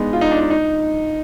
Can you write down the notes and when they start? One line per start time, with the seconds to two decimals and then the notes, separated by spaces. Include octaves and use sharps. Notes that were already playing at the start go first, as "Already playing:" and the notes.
Already playing: G#3 B3 D4 D#4
0.13 F4
0.21 D#4
0.31 D4
0.40 D#4
0.50 D#4